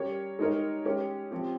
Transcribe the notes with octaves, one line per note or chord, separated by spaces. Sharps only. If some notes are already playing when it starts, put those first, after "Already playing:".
Already playing: G3 C#4 G4 A#4 C#5
G#3 D#4 G4 A#4 C#5
G#3 C#4 G4 C#5
F3 C4 G4